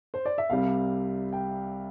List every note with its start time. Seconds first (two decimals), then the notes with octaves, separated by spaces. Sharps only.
0.14 C5
0.25 D5
0.38 E5
0.50 C2 C3 G3 F5
1.33 G5